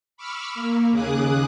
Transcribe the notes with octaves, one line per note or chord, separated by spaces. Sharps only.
B5 C#6 D6 E6 F6
A#3
D#2 C#3 G#4 D6 D#6 F#6